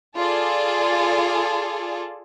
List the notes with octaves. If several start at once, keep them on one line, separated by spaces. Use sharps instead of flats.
F4 G#4 A4 D5